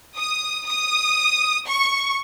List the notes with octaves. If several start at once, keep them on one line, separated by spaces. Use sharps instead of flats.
D#6
D#6
C#6